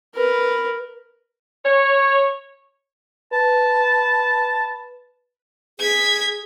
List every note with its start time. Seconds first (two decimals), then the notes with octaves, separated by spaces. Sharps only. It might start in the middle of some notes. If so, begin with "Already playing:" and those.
0.15 A#4 B4
1.65 C#5
3.33 B4 A5
5.79 G#4 G#6 B6